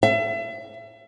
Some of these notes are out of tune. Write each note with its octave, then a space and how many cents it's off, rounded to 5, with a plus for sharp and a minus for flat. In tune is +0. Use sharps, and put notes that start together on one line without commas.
E5 +35